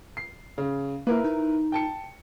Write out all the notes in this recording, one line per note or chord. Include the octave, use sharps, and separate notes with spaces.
C7
C#3
A#3 E4 A#4 B4
D#4
G5 A5 C#7